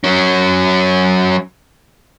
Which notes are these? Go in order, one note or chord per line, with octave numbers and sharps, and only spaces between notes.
F#3 C#4